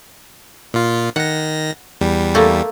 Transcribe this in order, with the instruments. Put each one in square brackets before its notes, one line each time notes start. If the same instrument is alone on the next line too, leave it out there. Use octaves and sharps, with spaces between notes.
[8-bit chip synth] A#2 F4
[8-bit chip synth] D#3 A#6 [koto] F#5
[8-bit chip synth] E2 G3
[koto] A3 A#3